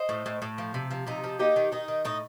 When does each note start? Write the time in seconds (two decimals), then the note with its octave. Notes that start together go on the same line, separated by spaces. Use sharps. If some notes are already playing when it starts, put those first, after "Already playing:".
Already playing: C5 D#5
0.09 A2
0.26 A2
0.42 A2
0.58 F3
0.74 C3
0.91 F3
1.07 C3 D#4
1.24 F3
1.39 A#3 D#4 G4
1.56 D#3
1.72 D#3 D#4
1.88 D#3
2.05 A2 D#4